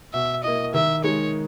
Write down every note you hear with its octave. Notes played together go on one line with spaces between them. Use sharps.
B2 E5
A#3 E4 D#5
D#3 E5
G#3 D#4 C#5